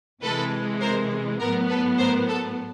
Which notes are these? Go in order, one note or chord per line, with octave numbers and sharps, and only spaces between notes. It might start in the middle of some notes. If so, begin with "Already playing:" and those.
C3 E3 G#3 A4 B4
A#4 C5
A2 F#3 B3 A#4
A4 B4
A#4 C5
A4